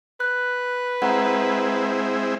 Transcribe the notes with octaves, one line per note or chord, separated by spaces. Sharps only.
B4 F#6
G#3 C4 E4 F#5 A#5